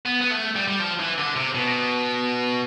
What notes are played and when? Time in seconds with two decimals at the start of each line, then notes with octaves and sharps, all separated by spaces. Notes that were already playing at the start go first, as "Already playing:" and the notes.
0.06 B3
0.21 B3
0.31 A3
0.56 G3
0.68 G3
0.80 F3
1.00 E3
1.18 D3
1.36 C3
1.55 B2